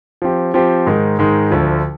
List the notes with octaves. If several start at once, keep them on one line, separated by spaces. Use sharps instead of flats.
F3 C4 G4
F3 C4 G4
G#2 D#3 G#3
G#2 D#3 G#3
D2 D3 F3